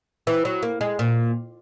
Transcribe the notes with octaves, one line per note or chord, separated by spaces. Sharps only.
E3
F#3
A#3
G#3
A#2